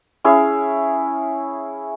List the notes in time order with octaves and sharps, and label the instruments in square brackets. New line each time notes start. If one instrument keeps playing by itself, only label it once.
[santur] C#4 E4 G#4 F5